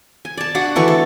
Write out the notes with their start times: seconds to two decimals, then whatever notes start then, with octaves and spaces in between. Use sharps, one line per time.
0.25 G#5
0.37 D5 A5
0.55 D4 F#4 F#5
0.76 D3 E3 A3 C#6
0.88 A4